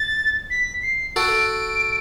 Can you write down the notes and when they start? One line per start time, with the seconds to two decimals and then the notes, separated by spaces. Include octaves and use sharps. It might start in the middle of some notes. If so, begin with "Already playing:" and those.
Already playing: A6
0.50 B6
0.83 C7
1.16 F#4 A4 D7